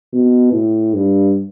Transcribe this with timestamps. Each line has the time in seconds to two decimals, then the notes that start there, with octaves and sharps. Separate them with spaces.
0.13 B2
0.52 A2
0.94 G2